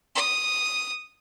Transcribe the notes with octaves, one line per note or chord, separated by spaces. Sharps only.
D#6